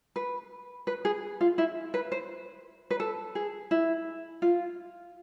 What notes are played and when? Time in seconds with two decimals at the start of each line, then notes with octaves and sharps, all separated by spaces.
0.16 B4
0.87 B4
1.05 G#4
1.41 F4
1.58 E4
1.94 B4
2.12 C5
2.91 B4
3.00 A4
3.35 G#4
3.71 E4
4.42 F4